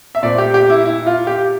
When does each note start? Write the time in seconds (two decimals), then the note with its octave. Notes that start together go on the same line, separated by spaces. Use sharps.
0.15 E5
0.23 A#2 A3 C4 D5
0.38 G4
0.54 G4
0.70 E4
0.85 E4
1.06 F4
1.27 G4